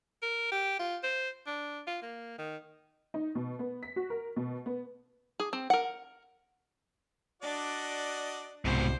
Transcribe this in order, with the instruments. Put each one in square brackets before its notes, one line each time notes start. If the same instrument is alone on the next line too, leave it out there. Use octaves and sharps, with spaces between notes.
[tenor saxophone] A#4
G4
F4
C5
D4
F4
A#3
D#3
[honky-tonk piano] D#4
B2
B3
B6
F#4
A#4
B2
B3
[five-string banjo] G#4
C4
A#4 F#5
[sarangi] D4 [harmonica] F#4 D5 D#5
[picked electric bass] C2 [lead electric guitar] G#2 B2 [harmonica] G4 [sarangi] C5